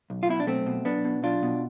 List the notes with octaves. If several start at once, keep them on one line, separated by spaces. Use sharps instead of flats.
B1
F4
B2 E4
D4
B1 A3 C4
B2
B1 B3 D4
B2
B1 D4 F4
B2